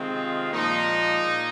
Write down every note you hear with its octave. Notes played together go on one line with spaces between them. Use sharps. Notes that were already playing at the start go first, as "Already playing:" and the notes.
Already playing: C3 D#3 G#3 C4 F4
A#2 F3 G#3 A#3 D#4
A#2